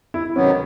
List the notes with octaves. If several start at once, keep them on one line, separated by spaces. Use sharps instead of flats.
E4
D2 C3 D#3 F#3 B3 C#4